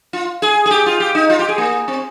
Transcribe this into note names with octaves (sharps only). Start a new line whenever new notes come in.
F4
G#4
G#4
G4
F4
G4
D#4
F4
G4
G#4
A#3
C4